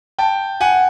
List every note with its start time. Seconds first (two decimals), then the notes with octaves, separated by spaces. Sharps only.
0.18 G5 A5
0.61 F#5 G#5